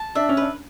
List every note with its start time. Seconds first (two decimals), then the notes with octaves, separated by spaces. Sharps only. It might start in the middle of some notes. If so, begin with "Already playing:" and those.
Already playing: A5
0.15 D4 E5
0.29 C#4
0.37 D4 B4